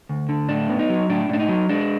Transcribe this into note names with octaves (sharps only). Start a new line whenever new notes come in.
D2
D3
A2 D4
B3
D#4
F#3
A2 D4
A2 D4
D#4
F#3
G#3 D4